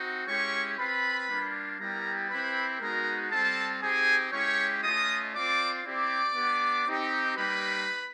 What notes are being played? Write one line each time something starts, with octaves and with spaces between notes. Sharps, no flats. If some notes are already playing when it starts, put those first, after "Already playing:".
Already playing: C4 D#4 F#4
G#3 C#4 E4 G4 C#5 C#6
C4 F4 B4 B5
G3 A#3 D4 F4
G3 B3 E4 G4 A#4 A#5
C4 E4 G4 B4 B5
G#3 B3 D#4 F#4 A#4 A#5
G3 C4 F4 A4 A5
C4 D#4 G4 G#4 G#5
G#3 C#4 E4 G4 C#5 C#6
A3 C#4 F4 D#5 D#6
C4 F4 D5 D6
C4 E4 G4 D5 D6
B3 D4 G4
C4 D#4 G4
G3 A#3 D#4 G4 B4 B5